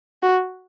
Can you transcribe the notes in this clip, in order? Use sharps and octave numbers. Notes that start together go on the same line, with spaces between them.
F#4